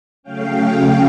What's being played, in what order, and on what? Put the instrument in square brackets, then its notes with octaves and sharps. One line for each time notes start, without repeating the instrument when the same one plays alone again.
[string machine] C#3 F#3 A3 C#4 F5 G5